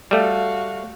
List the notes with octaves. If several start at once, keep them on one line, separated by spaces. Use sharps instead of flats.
G3 A3 F#4 F5